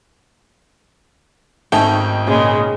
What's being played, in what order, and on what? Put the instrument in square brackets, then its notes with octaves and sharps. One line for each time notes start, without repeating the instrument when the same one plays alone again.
[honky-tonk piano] G#1 D#4 G5 [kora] A3 C#4
[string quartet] A#2 C#3 G#3